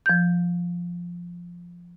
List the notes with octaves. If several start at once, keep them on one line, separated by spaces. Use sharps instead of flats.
F3 G6